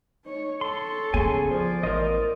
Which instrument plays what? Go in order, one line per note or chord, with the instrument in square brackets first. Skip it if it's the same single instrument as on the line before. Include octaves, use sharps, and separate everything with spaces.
[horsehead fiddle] D#4 C#5
[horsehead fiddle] A4 C#5 [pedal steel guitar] C6
[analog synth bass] C#3 [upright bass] B3 [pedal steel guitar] G#5 C6
[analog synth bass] F3 [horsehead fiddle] D5
[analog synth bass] A1 [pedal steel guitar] A#4 C5 D#5